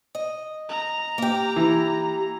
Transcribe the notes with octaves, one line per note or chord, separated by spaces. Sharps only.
D#5
A#5
A#3 G4
E3